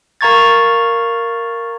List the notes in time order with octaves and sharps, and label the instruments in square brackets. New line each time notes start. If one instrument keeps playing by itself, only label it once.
[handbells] A#4 F5 A#5 C#6 G#6 A6